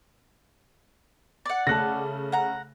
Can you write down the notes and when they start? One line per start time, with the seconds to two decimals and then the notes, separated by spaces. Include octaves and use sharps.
1.46 D5 F#5
1.67 C#3 A3 A5 F#6 A#6
2.32 F#5 A#5